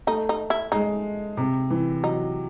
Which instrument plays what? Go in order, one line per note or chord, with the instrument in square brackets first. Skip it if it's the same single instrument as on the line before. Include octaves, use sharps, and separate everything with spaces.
[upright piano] A3 [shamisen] D#4
[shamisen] D#4
E4
[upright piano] G#3 [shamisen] D#4
[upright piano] C3
E3
[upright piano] F#3 [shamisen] D#4